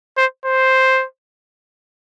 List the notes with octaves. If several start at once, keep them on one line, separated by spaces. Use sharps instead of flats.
C5
C5